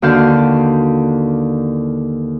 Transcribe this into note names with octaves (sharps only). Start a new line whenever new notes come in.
D#2 D3 F#4 F5 A5 G6